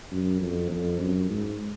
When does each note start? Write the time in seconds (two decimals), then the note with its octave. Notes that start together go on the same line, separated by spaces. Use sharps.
0.11 F#2
0.41 F2
0.71 F2
1.00 F#2
1.30 G#2